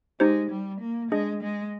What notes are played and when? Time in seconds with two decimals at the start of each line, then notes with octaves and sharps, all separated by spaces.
0.20 G#3 D#4 G4 C5
0.50 G3
0.81 A#3
1.11 G#3 D4 G#4 D#5
1.43 G#3